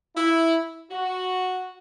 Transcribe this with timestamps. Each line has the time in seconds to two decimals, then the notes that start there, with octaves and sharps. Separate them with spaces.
0.16 E4
0.91 F#4